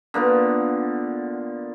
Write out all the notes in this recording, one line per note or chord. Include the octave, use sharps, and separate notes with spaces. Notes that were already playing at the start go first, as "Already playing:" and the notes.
D3 A#3 B3 F4